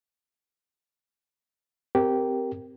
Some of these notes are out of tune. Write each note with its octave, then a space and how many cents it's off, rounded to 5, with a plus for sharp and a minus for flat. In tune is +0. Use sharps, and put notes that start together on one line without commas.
C4 -15 G4 -10 A#4 +0